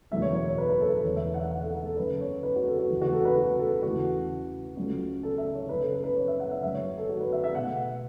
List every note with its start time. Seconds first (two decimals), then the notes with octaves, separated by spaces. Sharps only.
0.11 F#1 E2 B2 F#3 A3 E5
0.22 C#5
0.34 C#5
0.46 C#5
0.58 B4
0.69 B4
0.81 A4
0.93 A4
1.04 E1 E2 E3 A3 C#5
1.16 E5
1.34 F#5
1.40 E5
1.51 F#5
1.62 A4
1.73 A4
1.85 A4
1.97 F#1 F#2 C#3 B4
2.21 C#5
2.43 B4
2.56 F#4
2.67 A4
2.79 F#4
2.90 F#1 E2 C#3 A3
3.01 F#4
3.13 A4
3.25 B4
3.37 F#4
3.59 A4
3.83 E2 C#3 E3 A3 F#4
4.76 C#2 C#3 F#3 A3
5.23 A4
5.38 E5
5.54 C#5
5.69 F#1 F#2 C#3 B4
5.81 A4
5.93 A4
6.04 B4
6.16 C#5
6.28 E5
6.40 F#5
6.51 E5
6.62 F#1 F#2 F#3 E5
6.75 C#5
6.98 A4
7.09 F#4
7.20 B4
7.33 E5
7.44 E5
7.55 B2 A3 F#5